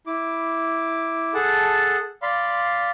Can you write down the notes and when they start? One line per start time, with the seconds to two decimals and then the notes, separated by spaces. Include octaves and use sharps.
0.07 E4 D6
1.34 G#4 A4 F#5 A5
2.22 D5 F5 B5 C6